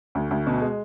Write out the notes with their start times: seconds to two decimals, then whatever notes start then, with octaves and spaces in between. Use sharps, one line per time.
0.15 D2
0.31 D2
0.47 B2
0.62 G#3